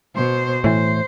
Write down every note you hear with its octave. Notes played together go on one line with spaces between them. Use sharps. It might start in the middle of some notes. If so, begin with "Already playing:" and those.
B2 C5
A2 E3 C5